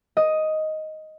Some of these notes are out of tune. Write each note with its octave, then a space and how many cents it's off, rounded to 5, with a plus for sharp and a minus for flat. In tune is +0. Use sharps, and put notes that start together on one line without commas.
D#5 +5